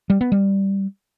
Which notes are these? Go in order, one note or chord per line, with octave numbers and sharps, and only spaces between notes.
G3
B3
G3